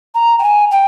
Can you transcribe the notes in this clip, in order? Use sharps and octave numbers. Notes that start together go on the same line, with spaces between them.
A#5
G5
G#5
G5